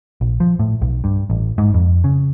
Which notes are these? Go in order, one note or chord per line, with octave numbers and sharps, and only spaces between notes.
A#1
F3
A2
B1
G2
A1
G#2
F2
C#3